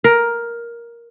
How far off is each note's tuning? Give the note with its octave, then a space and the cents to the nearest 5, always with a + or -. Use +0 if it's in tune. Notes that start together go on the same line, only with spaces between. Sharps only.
A#4 +10